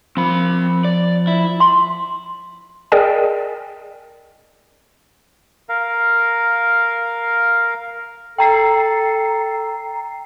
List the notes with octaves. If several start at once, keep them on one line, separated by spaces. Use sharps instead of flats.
F3 C4 B5
D5
E4
C6
G#4 A#4 D5 D#5 G5 G#5
A#4 F5
A4 G5 A#5 C7